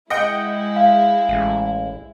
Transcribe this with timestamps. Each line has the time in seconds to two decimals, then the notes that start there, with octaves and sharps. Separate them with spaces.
0.10 G#3 E4 D#5 F#5 G5
0.76 F5
1.28 A1